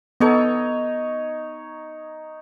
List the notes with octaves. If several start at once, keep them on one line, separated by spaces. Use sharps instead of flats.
B3 D#4 A4 C#5 D#5